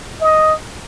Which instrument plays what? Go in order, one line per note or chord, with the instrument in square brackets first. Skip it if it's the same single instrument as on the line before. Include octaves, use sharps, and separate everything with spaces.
[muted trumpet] D#5